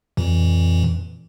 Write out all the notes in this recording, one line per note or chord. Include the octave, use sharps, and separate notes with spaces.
F2 A#2 E3